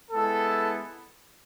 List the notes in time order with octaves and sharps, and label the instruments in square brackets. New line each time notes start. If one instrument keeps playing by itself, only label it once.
[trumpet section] G#3 B3 E4 A4